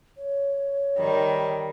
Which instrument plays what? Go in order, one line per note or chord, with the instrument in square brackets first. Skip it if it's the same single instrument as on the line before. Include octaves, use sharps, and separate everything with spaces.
[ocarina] C#5
[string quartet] D#3 G3